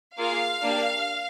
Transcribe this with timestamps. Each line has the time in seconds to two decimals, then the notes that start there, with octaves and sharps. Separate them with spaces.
0.18 A#3 F4 G#4 F5
0.62 A#3 D4 G4